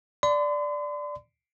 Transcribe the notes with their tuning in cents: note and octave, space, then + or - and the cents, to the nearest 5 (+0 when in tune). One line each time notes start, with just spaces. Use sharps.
D5 +0 C6 -45